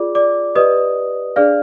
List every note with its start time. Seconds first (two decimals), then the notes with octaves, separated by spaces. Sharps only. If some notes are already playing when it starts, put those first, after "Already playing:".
Already playing: F4 G#4 D5 D6
0.15 D5 D6
0.55 G4 B4 D5 D#5 D#6
1.36 D4 G#4 D5 F5 F6